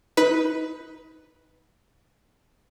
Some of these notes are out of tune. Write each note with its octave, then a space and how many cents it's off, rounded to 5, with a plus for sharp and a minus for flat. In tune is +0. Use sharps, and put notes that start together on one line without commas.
D#4 +25 B4 +0